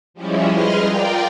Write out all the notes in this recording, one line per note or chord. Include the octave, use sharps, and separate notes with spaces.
F3 G3 G#3 C#4 E4
G#4 B4 D#5 C6 F6
F4 A#4 D5 G5